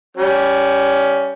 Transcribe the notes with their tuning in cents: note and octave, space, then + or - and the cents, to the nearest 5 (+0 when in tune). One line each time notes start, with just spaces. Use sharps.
G3 +0 C#4 +15